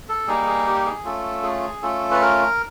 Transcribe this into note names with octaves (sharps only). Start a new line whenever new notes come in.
A4
G3 A#3 D#4 G#4
G#4
G4
G#4
A3 C#4 F4 A4
G#4
A3 C#4 F4 A4
B4
A#4